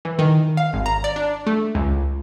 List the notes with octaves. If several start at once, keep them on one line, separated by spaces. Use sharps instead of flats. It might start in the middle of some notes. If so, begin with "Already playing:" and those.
E3
D#3
F5
G#1
A#5
D5
D4
A3
C#2